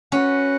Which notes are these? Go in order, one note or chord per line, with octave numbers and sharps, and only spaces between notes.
C#4 F#4 B4 F#5